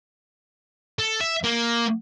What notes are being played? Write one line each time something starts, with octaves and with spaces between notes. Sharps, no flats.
A4
E5
A#3